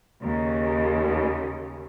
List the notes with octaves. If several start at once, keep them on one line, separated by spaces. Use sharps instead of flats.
D#2 C#3